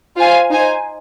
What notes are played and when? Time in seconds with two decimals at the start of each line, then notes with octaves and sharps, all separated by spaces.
0.16 F4 C5 F5 G#5
0.49 D#4 C5 G#5